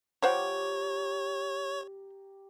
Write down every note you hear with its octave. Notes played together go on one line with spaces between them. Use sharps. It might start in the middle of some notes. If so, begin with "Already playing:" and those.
F3 G4 C5 C#5 F#5 A#5 D6